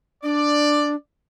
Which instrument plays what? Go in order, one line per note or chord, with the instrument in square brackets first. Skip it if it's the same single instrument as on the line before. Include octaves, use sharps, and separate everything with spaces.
[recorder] D4 [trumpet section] D5